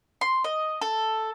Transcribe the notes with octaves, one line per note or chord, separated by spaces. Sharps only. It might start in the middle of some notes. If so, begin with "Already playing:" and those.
C6
D#5
A4